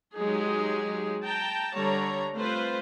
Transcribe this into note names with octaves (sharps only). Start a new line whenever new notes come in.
F#3 G#3 D#4 G4 G#4
G5 A5 A#5
D3 G3 C#5 A#5
A3 C4 F4 B4 C5